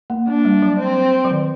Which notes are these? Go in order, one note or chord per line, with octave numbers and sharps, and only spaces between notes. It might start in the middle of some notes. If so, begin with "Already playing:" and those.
A#3
A#3 D4
G3
F#3
C4
F#3
D#3